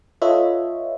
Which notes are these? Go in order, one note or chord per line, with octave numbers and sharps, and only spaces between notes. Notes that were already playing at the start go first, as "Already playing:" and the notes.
F4 A4 B4 C#5 D#5 E5